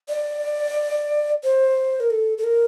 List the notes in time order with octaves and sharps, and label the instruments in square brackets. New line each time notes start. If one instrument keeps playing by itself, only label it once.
[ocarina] D5
C5
A#4
A4
A4
A#4